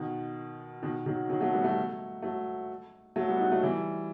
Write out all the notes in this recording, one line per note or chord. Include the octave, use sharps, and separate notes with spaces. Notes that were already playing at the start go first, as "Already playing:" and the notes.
Already playing: B2 D#3
B2 D#3
D#3 F#3
D#3 F#3
F#3 A3
G3 B3
F#3 A3
F#3 A3
F#3 A3
G3 B3
D#4 F#4
F#3 A3
E3 G3